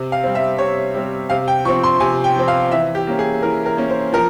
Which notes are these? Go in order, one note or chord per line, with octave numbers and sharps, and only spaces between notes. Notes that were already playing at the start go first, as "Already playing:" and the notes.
Already playing: C3
F5
G3 C4
E5
C3 C#5
G3 C4
C3 F5
G5
F3 C4 C#6
C6
C3 G#5
G5
F3 C4
F5
E3 E5
G4
A#3 C#4
G#4
E3 A#4
A#4
A#3 C#4
C5
F3 A#4